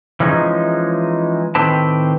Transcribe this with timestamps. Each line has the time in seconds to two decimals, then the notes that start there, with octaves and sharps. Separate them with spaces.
0.20 E3 F3 G#3 C#4 D#4
1.55 A2 D#3 C4 G4 B4 A5